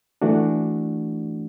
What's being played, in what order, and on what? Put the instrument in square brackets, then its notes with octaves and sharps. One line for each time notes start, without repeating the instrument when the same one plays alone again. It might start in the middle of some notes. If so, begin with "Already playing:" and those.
[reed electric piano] E3 A3 D4 F#4